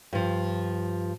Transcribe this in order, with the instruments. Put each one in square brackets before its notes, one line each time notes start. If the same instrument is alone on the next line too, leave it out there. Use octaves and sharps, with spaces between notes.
[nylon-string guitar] G2 F3